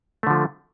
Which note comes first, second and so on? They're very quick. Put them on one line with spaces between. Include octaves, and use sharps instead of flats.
A3 D3 F3